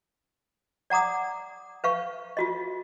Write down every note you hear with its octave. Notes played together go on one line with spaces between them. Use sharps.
D5 F#5 A#5 D6 D#6
B4 F5 C#6
F4 F#4 D#5